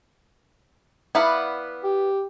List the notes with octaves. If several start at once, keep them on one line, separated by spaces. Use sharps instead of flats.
B3 E4 D5 F5 F#5
G4